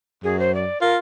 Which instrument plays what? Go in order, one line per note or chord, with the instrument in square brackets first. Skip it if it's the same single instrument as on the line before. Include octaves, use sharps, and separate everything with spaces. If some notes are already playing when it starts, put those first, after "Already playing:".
[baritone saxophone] F#2 [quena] G#4
[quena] C5
D5
[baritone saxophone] F4 [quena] A#4